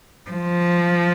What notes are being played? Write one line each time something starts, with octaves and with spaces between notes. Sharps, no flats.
F3